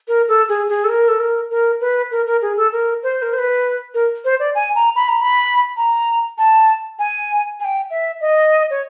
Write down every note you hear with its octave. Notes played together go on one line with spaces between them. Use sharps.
A#4
A4
G#4
G#4
A4
A#4
A4
A#4
A#4
B4
A#4
A#4
G#4
A4
A#4
C5
A#4
C5
B4
A#4
C5
D5
G#5
A#5
B5
A#5
B5
A#5
A5
G#5
G#5
G5
E5
D#5
C#5